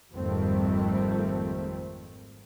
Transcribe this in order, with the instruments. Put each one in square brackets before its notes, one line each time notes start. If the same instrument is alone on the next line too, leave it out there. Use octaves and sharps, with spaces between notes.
[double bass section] G#1 F2 D#3 G3 A3 C4